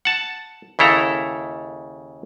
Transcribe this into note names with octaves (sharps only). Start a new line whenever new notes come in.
F#5 A5
D#2 C#3 E4 A4 A#5